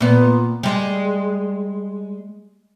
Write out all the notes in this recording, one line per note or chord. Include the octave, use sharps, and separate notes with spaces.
A#2 B3
G3 G#3